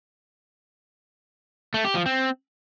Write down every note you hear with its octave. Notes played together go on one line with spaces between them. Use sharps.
A3
G4
F3
C4